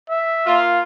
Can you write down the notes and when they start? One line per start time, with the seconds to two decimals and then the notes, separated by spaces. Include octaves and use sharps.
0.10 E5
0.46 A#3 F4